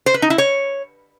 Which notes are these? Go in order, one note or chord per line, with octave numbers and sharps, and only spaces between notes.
C5
B4
D#4
E4
C#5